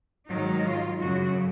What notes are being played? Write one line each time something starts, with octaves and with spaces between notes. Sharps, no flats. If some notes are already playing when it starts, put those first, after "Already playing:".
G#2 D#3 F#3 D#4
F4
F#2 C#3 F#3 F#4